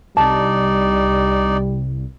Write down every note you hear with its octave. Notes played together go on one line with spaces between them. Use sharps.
C2 G3 D#4 D5 A5